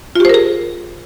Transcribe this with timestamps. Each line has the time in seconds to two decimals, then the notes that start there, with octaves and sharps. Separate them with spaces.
0.15 F4
0.20 G4
0.25 C5
0.29 A#4
0.34 G#4